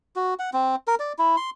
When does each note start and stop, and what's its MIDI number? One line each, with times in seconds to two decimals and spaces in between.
0.16 0.34 66
0.39 0.50 78
0.53 0.76 60
0.88 0.95 70
1.00 1.13 74
1.19 1.36 64
1.37 1.50 84